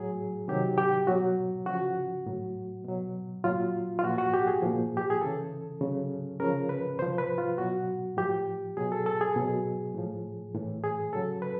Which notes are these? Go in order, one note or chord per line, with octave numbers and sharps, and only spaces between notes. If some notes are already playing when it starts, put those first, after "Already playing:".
Already playing: A2 F#3 G#4
C3 D#3 F#3 G4
G4
B2 F#3 F#4
C#3 F3 F#4
A2 F#3
B2 F#3
A#2 F#3 F4
F4
A#2 F3 F#4
F#4
G4
G#4
A#2 F3
G4
G#4
C#3 E3 A4
C#3 F#3
C#3 F3 A#4
B4
C3 F3 C5
B4
F4
B2 F#3 F#4
A2 F3 G4
B2 F#3 G#4
A4
A4
G#4
B2 F#3
A2 F3
A2 E3
G#4
C#3 F#3 A4
B4